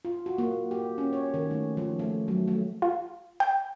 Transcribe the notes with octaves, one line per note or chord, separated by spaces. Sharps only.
F4
F#4
A#3
G4
C#4
C#5
D#3
A3
F3
A3
F#3
A3
F4
G5